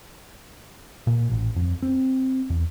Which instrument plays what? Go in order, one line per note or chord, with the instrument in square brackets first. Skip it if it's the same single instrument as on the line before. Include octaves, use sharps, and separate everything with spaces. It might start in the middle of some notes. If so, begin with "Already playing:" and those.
[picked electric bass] A#2
A1
F2
C4
E2